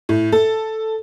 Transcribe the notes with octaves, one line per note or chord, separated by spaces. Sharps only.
A2
A4